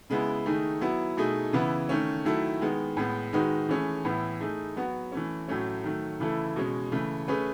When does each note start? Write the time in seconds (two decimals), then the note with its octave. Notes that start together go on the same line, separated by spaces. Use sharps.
0.10 C#3 G#3 B3 E4
0.46 D#3 A3 D#4 G#4
0.81 F#3 B3 E4
1.17 B2 A3 D#4 G#4
1.53 C#3 E3 B3 E4
1.89 D#3 A3 C#4
2.25 D#3 F#3 A3 E4 A4
2.61 D#3 G#3 B3
2.97 A2 G#3 B3
3.33 D#3 G#3 D#4 F#4 B4
3.69 E3 A3 C#4 G#4
4.05 A2 E3 B3 E4
4.40 A3 D#4 G#4
4.76 F#3 B3 F#4
5.12 E3 A3 C#4
5.48 A2 F#3 A3 C#4
5.84 D#3 F#3 A3
6.20 C#3 E3 A3 E4 A4
6.56 B2 G#3 C#4
6.92 C#3 E3 A3
7.28 A3 C#4 G#4 B4